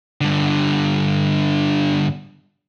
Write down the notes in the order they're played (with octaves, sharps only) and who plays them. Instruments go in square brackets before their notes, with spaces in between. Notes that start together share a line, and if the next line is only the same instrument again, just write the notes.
[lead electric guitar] G2 D3